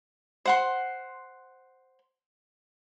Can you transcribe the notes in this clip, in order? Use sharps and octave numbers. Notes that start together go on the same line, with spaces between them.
C5 F#5 C6